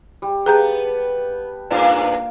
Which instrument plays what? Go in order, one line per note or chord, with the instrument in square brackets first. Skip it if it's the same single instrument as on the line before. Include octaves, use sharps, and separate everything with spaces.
[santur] G3
[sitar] B3 [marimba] G#4 A#5 G6 [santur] G5 A5
[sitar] G2 B3 D4 [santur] A#3 F4